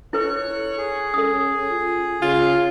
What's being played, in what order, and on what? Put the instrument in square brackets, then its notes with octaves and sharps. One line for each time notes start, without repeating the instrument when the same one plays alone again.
[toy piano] E4 A4 B4 [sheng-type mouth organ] C#5 C#6 F#6
[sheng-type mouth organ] G#4
[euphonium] C#4 [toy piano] A4 D#6
[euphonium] F4
[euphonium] C#3 [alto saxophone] F4